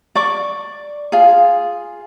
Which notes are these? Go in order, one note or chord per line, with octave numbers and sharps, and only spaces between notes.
D5 C#6 D6
F4 G#4